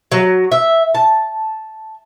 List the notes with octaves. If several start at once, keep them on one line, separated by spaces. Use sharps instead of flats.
F#3
E5
A5